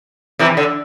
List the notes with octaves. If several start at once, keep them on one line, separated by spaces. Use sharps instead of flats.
C3 E3
D3